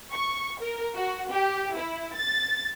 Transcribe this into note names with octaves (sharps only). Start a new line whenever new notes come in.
C#6
A#4
F#4
G4
E4
A6